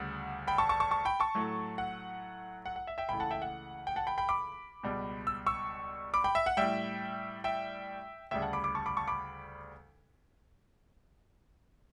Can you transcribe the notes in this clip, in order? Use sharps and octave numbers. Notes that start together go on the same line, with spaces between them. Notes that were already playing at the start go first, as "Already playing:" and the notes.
Already playing: D2 C#3 G3 F#5
G5 B5
A5 C#6
A5 C#6
A5 C#6
A5 C#6
G5 B5
A5 C#6
A2 F#3 A3
F#5
F#5
F#5
E5
E5 G5
C#2 C#3 E3 A3 G5 B5
F#5 A5
E5 G5
F#5
G5
F#5 A5
G5 B5
G5 B5
B5 D6
C#2 B2 G3
E6
C#6 E6
B5 D6
G5 B5
E5
F#5
A2 G3 E5 G5
E5 G5
D2 C#3 G3 E5 G5
F#5 A5
B5 D6
B5 D6
A5 C#6
B5 D6
A5 C#6
B5 D6